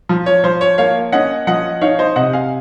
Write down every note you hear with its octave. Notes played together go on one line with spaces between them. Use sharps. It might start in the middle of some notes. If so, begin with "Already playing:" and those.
F3
C#5
F3 C5
C#5
A#3 C#5 F5
C#4 D#5 F#5
F3 D#5 F#5
D#4 C#5 F5
C5 D#5
C3 D#5 F#5
F5 G#5